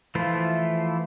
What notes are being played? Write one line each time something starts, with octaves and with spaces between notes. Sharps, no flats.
E3 F3 A3 E4 F4